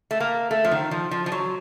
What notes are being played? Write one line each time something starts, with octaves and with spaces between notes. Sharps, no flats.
A3
A#3
A3
F3
D#3
F3
F3
F3
F#3